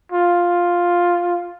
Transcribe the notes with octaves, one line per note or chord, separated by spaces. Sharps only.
F4